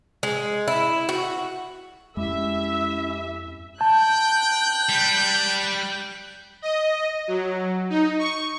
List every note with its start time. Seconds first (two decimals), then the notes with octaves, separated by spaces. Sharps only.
0.23 G#3
0.68 E4
1.09 F#4
2.17 F2 G#3 C#4 E4 G4 E5
3.81 G5 A5 F#6 G6
4.89 G3
6.62 D#5
7.28 F#3
7.90 D#4
8.19 C#6